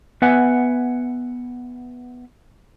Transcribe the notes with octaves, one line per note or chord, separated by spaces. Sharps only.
B3 B4 E5 F#5 G#5